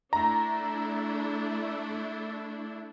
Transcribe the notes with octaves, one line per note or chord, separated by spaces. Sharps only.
A3 D4 E4 A#5